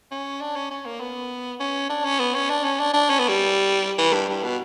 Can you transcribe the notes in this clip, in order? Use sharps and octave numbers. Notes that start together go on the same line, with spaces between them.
C#4
D4
C#4
C#4
A#3
B3
C#4
D4
C#4
B3
C#4
D4
C#4
D4
D4
C#4
B3
G3
E3
G2
G2
B2